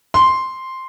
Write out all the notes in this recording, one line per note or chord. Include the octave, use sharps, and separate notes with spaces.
C6